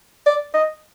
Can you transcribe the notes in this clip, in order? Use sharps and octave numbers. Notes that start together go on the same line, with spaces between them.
D5
D#5